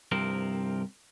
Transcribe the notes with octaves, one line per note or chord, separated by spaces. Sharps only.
C2 G2 C3 F3 C4 A#4